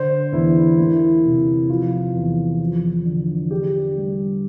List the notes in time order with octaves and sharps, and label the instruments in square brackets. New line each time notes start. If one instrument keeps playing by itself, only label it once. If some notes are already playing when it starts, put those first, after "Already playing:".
Already playing: [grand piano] D3 C5
E2 E4
A#3 E4
C3
F3 F4
E2
F3
D3
D4 G4
G3